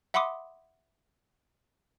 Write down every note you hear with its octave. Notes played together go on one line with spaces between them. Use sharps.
E5 F#5 B5 C6 D6 D#6